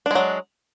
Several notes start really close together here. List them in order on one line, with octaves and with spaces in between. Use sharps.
D4 G#3 F#3